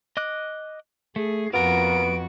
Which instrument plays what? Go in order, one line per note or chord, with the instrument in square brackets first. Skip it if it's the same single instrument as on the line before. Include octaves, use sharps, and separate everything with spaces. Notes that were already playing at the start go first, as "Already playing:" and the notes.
[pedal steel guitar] D#5 D6 F#6
[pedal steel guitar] A3 [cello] G#4
[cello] F2 F#4 [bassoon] B3 [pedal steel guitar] F4 A#4 [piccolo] D7